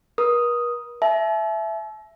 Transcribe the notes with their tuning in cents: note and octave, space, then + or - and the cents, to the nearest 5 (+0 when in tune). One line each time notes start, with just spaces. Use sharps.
A#4 +45 D#6 +0
E5 +5 A5 -45